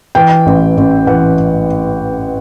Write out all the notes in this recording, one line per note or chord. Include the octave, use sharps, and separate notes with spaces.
E3 G5
A1
A1
E3 F#5